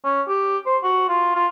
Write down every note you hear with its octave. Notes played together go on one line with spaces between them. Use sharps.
C#4
G4
C5
F#4
F4
F4